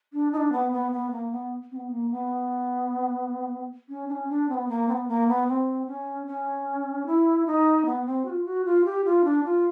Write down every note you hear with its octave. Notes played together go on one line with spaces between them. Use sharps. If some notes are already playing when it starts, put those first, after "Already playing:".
D4
D#4
D4
B3
B3
B3
A#3
B3
C4
B3
A#3
B3
C#4
D4
C#4
D4
C4
B3
A#3
C4
B3
A#3
B3
C4
C#4
C#4
E4
D#4
B3
C4
F#4
F4
F#4
F4
G4
F4
D4
F4